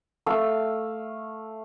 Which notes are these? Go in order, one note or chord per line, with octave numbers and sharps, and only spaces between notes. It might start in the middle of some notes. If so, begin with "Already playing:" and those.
A3 F5 E6